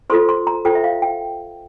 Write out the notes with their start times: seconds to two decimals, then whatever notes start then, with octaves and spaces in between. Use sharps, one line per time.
0.10 F4 A4 C5 C6
0.29 C6
0.47 A#5
0.65 F4 A4 C5 G5
0.75 E5
0.84 F5
1.02 G5